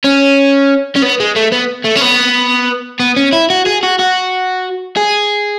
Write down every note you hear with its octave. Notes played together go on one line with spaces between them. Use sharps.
C#4
C#4
B3
G#3
A3
B3
A3
C#4
B3
B3
C#4
E4
F#4
G#4
F#4
F#4
G#4